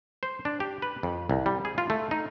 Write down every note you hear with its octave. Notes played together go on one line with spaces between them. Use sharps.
C5
D4
G4
B4
F2
C2
G3
G#4
F4
A3
D#4